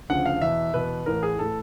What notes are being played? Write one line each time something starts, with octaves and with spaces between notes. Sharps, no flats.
D2 C#3 F3 F#5
F5
E2 B2 E5
E2 B2 B4
A1 A2 E3 A#4
G#4
A2 E3 A4